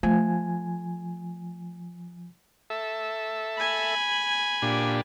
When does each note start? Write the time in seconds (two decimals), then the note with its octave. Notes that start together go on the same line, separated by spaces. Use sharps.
0.03 F3 A3 G#5
2.70 A4 E5
3.58 G#5 B5
4.62 A#2 D4 G4